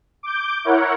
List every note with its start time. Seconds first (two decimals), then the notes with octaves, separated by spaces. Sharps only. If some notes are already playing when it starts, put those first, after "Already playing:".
0.23 D6 G6
0.65 E4 A#4 C#5 F#5